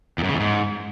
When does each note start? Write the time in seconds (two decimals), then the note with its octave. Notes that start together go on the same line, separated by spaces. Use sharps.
0.18 E2
0.24 F#2
0.29 C#3
0.34 E2
0.40 G#2